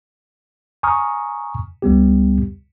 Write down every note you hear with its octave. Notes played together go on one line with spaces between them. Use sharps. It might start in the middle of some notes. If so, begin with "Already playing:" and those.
G#5 A#5 C#6 D#6 F6
C#2 G3 B3 G4